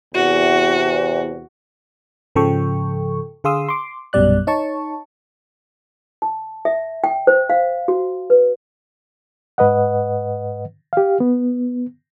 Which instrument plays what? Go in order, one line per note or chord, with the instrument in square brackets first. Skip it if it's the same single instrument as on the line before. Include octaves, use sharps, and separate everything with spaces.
[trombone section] E2 C3 [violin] F#4
[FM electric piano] G#2 C#3 F3 A4 G5 C#6
D3 G#4 F5 C6 D#6 E6
C6 D6
A#1 F#2 B2 G3 D5 F#6
D#4 C#5 A5 C#6
[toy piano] A5
E5
G5
C5
F5
F#4
B4
[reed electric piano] G#2 B4 D#5 F#5
G4 F5
B3